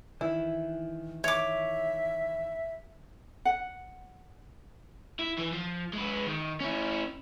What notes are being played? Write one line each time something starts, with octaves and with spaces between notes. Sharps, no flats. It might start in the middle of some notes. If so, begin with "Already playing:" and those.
D#3 E3 E4
C#5 E5 D6
F#5
E4
E3
F3
G#3 B4
D#3
C#4 E4